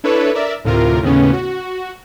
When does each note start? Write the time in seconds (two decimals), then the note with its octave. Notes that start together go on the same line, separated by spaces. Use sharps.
0.04 D4 E4 A4 B4 C#5
0.35 A#4 D5 E5
0.64 D2 A2 C3 F4 A#4
1.03 D#2 A2 C#3 B3 C#4
1.33 F#4